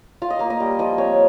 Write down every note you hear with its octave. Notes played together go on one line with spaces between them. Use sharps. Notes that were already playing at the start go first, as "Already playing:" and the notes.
F4 F5
D#5
A#3 F5
D#5
G3
F3 D#5
C4 C#5